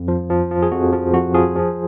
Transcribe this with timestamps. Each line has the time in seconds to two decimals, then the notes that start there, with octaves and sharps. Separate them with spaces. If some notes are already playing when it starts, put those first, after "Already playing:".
Already playing: F2
0.08 F3
0.30 F3
0.51 F3
0.62 G#4
0.72 F2 F#4
0.93 F3
1.13 F2 F#4
1.34 F3 F4 G#4
1.56 F3